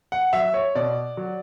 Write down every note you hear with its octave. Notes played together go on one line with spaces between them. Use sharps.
F#5
F#3 E5
C#5
B2 D5
F#3